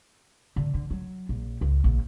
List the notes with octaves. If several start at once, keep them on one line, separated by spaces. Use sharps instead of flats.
D3
D3
F#3
A#1
C#2
A#1